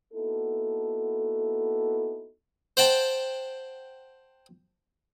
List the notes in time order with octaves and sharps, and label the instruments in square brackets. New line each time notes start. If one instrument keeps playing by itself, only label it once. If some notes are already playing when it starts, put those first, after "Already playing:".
[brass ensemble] A#3 B3 D#4 E4 F#4 A4
[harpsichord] C5 F#5 G5 A5